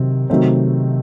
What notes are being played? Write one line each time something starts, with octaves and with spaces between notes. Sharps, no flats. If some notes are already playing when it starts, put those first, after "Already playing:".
Already playing: C3 D#3 F#3 C4
C3 D#3 F#3 A3 C4